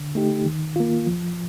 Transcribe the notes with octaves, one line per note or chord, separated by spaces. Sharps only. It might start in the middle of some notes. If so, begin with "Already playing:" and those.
Already playing: D3
A3 D#4 G4
D#3
A#3 F4
F3